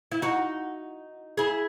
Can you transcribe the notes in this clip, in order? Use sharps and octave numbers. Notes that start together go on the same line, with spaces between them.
E4
D#4 F#4
E4 G#4